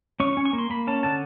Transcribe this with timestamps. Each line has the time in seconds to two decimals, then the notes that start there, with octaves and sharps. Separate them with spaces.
0.20 C#4 C#6
0.33 C#6
0.37 C#4
0.46 C#6
0.53 A#3
0.58 C6
0.70 A#3 B5
0.87 C#4 A5
1.03 D3 A5